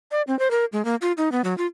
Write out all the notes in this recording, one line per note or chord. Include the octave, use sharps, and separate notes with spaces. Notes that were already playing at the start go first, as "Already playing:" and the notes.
D5
C4
C5
A#4
G#3
A#3
F4
D#4
B3
F#3
F4